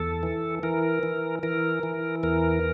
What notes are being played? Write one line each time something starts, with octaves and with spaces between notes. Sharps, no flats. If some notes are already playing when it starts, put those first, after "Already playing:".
Already playing: E2 A4
E3
E3 A#4
E3
E3 A#4
E3
E2 A#4